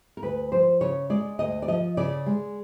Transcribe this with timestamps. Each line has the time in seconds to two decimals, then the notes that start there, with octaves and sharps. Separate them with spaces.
0.17 A#4
0.22 D2 B4
0.52 F3 C5
0.81 C#3 C#5
1.10 G#3 D5
1.39 D2 D#5
1.62 D5
1.68 F3 D#5
1.97 C#3 D5
2.26 G#3